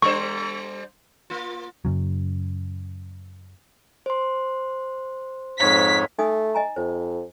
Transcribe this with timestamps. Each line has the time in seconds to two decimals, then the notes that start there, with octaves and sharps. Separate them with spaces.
0.02 G3 D4 C5 C#6
1.30 A#3 F4
1.85 F#2 C#3 F#3
4.06 C5 C6
5.61 F2 G#2 C#5 B6
6.19 A3 D#4 G#5 D#6
6.55 D#5 G#5 A#5
6.76 F2 C5